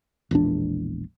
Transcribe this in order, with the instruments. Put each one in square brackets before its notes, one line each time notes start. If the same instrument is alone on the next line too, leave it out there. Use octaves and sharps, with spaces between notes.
[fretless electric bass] E1 A#1 E2 D4